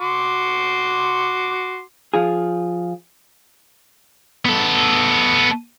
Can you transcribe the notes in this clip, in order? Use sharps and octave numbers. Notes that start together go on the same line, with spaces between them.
F#4 C6 D6
F3 F4 G#4
B3 A4